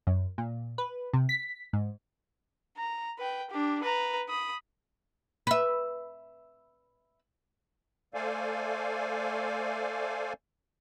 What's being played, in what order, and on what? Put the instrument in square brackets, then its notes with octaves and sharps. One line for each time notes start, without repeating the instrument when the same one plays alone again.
[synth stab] F#2
A#2
B4
C3
B6
G#2
[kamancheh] A#5
B4 G5
D4 G4
B4 A#5
B5 D#6
[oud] B4 E5
[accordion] A3 A4 C5 D5 F5 G#5